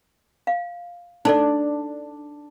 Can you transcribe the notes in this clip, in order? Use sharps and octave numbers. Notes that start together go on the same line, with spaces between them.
F5
D4 D#4 A4 D5